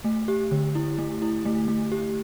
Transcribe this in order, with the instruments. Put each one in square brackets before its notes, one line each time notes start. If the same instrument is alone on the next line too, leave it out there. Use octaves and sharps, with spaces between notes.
[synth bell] A3
G4
D3
E4
A3
E4
A3
A3
G4